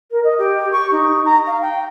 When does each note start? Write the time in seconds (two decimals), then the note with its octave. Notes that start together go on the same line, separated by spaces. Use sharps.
0.11 A#4
0.24 D#5
0.39 G4
0.72 C#6
0.91 D#4
1.25 A#5
1.47 F5
1.62 G5